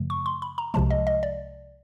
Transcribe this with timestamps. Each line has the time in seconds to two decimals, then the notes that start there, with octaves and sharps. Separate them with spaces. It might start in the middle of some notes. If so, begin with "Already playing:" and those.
Already playing: F#2 C#3 F3 A3
0.10 C#6
0.26 C6
0.42 B5
0.58 A#5
0.74 C2 C3 F3 G#3 A5
0.91 D#5
1.07 D#5
1.23 D5